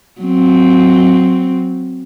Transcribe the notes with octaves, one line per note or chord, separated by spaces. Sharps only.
F#3 C4